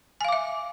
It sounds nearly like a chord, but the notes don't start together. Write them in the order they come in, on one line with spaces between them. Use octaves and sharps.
G#5 F5 D6 E5